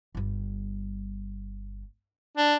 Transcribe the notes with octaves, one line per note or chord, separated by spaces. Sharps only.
G1 G3
D4